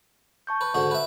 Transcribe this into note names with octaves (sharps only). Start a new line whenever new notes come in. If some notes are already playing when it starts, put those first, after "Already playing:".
A5 C#6 G6
B4
G#2 D3 F#4
B4 E5